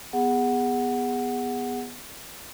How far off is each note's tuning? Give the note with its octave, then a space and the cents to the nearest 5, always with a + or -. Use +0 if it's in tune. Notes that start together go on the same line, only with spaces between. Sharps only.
B3 +0 G#4 -20 F#5 +0